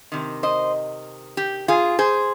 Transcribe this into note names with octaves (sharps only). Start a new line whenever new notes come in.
C3 D#3
C5 D#5
G4
F4 G#4
G#4 C5